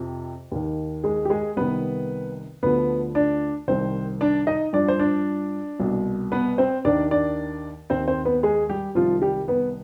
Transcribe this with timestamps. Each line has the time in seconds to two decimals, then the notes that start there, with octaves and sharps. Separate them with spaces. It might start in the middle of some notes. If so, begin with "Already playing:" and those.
Already playing: F2 C3 F3
0.52 D#2 D#3
1.04 G#3 G#4
1.25 G4
1.30 G#3 G#4
1.57 C2 C3 D#3 B3 B4
2.63 D2 D3 F3 B3 B4
3.15 D4 D5
3.68 C2 C3 D#3 C4 C5
4.21 D4 D5
4.47 D#4 D#5
4.73 G2 F3 D4 D5
4.88 C5
4.99 D4 D5
5.80 C2 B2
6.32 B3 B4
6.58 C4 C5
6.84 D#2 D#3 D4 D5
7.11 D4 D5
7.90 D#2 D#3 C4 C5
8.08 C4 C5
8.25 B3 B4
8.43 G#3 G#4
8.69 G3 G4
8.95 C2 C3 D#3 F3 F4
9.22 G3 G4
9.48 B3 B4